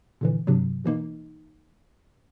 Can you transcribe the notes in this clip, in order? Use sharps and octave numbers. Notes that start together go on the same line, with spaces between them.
A#2 D3 E3
G2 C3 F#3
B2 E3 A#3 D#4